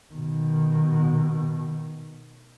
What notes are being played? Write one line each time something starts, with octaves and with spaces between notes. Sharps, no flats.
B2 D#3